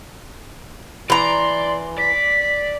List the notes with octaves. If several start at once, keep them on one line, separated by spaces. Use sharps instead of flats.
E3 D5 A#5 C6
D5 B6